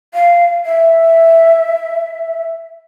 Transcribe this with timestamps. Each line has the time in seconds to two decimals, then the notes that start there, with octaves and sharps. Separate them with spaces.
0.14 F5
0.66 E5